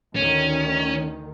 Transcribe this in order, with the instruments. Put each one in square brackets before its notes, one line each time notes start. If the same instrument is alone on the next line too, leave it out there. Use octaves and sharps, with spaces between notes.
[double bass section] D2 D#3 [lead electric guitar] C#4